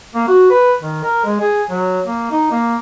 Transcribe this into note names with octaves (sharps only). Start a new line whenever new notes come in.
A#3
F#4
B4
D#3
A#4
G#3
G#4
F#3
A#3
D#4
A#3